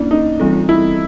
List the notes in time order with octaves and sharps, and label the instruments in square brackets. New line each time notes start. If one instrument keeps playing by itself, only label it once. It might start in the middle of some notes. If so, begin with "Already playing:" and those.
Already playing: [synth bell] A#3 C#4 E4 [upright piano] D4
[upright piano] D#4
[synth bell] E3 G3 C4 F4 A4
[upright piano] E4